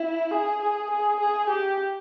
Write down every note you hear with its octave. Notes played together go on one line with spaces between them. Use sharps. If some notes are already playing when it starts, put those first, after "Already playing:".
Already playing: E4
G#4
G#4
G#4
G#4
G4